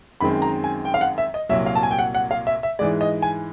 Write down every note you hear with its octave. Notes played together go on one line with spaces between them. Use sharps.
F#2 D#3 G#3 C4 B5
A#5
G#5
G5
F5
F#5
E5
D#5
C2 A#2 F#3 E5
F5
A5
G#5
G5
F#5
F#5
F5
E5
E5
G#2 E3 G#3 D5
D#5
G#5